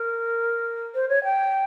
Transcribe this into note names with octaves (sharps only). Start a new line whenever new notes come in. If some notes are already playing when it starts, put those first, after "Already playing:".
Already playing: A#4
C5
C#5
G5